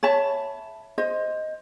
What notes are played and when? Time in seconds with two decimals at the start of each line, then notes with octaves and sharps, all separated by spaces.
0.03 C#5 E5 A5 B5
0.98 C5 D#5